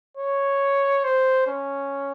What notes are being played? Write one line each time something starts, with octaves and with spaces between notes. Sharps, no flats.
C#5
C5
C#4